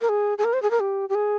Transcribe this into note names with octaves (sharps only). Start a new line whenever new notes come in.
A#4
G#4
G#4
A#4
C5
G#4
A#4
G4
G4
G#4